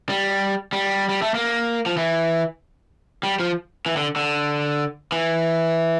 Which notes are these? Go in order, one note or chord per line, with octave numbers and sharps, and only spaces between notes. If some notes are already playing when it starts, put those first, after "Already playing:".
G3
G3
G3
A3
A#3
F3
E3
G3
F3
E3
D3
D3
E3